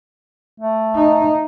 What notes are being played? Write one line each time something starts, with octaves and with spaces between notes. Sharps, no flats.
A3
D#4